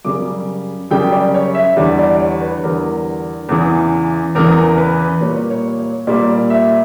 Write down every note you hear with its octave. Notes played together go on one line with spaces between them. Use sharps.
F#2 C#3 G3 D6
F#2 C#3 G3 G5
D5
C#5
E5
E2 D3 G3
D5
C#5
B4
E2 D3 G3 A#4
E2 C#3 E3
E2 C#3 E3 A#4
B4
A#2 G3 A#3 C#5
C#5
C#5
A#2 G3 A#3 D5
E5